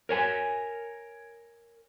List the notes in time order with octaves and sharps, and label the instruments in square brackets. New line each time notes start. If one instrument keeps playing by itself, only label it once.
[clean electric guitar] A#4 C#5 G#5